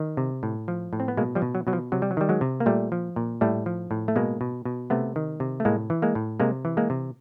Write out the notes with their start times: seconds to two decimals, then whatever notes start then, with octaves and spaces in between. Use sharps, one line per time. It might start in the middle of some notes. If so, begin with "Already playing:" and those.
Already playing: D#3
0.17 C3
0.43 A2
0.68 F3
0.93 A2
1.00 C4
1.08 B3
1.17 B2 G#3 A#3
1.35 F3 G3
1.42 B2
1.55 F#3
1.67 B2 F#3
1.73 F3
1.92 C3 F#3
2.02 G3
2.11 F#3
2.17 D#3 G3
2.29 F#3 G#3
2.41 C3
2.60 A#3
2.66 A#2 G3 A3
2.92 F3
3.16 A#2
3.41 A2 G3 A3
3.66 F3
3.91 A2
4.08 A3
4.16 B2 G#3 A#3
4.41 B2
4.65 B2
4.90 C3 A3 B3
5.16 D#3
5.40 C3
5.60 A3
5.65 A2 G#3 A#3
5.90 E3
6.02 G#3 A#3
6.15 A2
6.40 C3 G#3 A#3
6.65 E3
6.77 G#3 A#3
6.90 C3